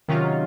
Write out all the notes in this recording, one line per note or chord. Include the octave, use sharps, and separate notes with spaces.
C3 D#3 F#3 C#4 F4